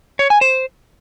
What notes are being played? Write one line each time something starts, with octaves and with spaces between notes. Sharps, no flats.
C#5
G#5
C5